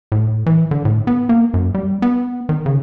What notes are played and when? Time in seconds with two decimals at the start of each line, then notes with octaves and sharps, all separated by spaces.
0.12 A2
0.46 E3
0.71 D3
0.85 A2
1.07 B3
1.29 A#3
1.54 F#2
1.74 G3
2.02 B3
2.49 D#3
2.66 C#3